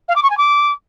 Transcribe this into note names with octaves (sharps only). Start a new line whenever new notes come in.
F5
D6
C#6
G#5
D6